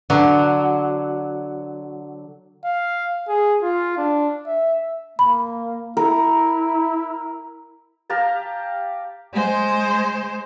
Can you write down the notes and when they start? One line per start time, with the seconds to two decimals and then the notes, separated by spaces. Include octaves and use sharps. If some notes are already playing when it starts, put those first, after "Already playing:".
0.10 D3 F#3
2.65 F5
3.28 G#4
3.62 F4
3.98 D4
4.47 E5
5.19 A#3 B5
5.97 E4 A#4
8.10 G4 F5 A5 A#5
9.33 G#3 C5